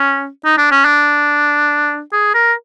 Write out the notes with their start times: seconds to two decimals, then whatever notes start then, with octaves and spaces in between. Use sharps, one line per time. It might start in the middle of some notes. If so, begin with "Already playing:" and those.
Already playing: C#4
0.45 D#4
0.58 D4
0.71 C#4
0.85 D4
2.13 G#4
2.34 A#4